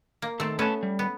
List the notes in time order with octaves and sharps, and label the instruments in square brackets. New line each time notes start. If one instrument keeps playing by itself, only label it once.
[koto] A#3
[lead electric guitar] D#3 A4 [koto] A3 C4
[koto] A3 B3 C#4 [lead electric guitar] B4 A5
[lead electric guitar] G3
[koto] B3